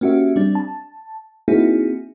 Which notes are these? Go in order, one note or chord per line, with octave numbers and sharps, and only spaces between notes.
A#3 C#4 F#4 G4 E5
G3 C4 D4
A5
A#3 C4 D#4 E4 F#4 G#4